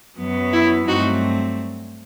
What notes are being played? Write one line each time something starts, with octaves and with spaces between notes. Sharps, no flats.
F#2 F#3 B3
E4
G2 F#3 A3 C4 D#4 F#4